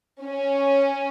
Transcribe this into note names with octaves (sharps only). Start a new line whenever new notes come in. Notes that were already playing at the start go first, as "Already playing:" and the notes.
C#4